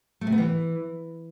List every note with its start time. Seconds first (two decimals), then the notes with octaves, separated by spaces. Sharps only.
0.21 A3
0.27 C3
0.32 B3
0.38 E3